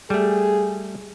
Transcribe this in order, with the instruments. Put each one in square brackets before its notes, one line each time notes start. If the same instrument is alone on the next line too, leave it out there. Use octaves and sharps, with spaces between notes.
[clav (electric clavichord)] G3 A3 [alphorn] G#4